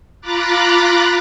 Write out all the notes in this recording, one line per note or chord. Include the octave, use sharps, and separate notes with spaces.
F4 A#5 B5 D6 F#6 A6